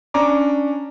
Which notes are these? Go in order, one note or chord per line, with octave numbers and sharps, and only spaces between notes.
C#4 D4 A#5 D6